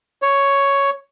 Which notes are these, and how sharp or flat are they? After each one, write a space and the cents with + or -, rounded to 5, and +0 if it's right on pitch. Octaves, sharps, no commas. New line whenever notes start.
C#5 +5